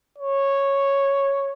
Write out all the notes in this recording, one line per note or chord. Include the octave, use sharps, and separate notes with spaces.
C#5